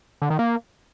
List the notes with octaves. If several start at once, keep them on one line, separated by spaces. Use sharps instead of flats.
D3
D#3
A#3